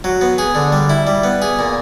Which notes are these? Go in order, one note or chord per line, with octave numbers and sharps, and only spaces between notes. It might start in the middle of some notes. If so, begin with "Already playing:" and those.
F#3
B3
G#4
D3
G3
E4
G3
B3
G#4
A#2